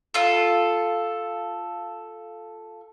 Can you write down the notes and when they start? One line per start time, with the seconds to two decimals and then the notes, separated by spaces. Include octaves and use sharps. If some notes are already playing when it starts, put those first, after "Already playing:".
0.14 F4 A4